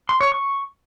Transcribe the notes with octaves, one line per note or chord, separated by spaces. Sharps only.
C6
C#5
C#6